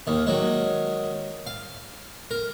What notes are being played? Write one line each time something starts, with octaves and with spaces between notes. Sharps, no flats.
D#2 D#3
D#3 F#3 G#3
F5
A#4